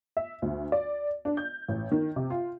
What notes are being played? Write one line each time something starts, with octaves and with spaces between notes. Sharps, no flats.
E5
D2
D5
D4
G6
A1
D#3
C3
F4